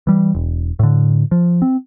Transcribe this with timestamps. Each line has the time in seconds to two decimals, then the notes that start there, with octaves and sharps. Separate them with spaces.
0.07 E3 G3
0.35 E1
0.79 A2 D3
1.31 F3
1.62 C4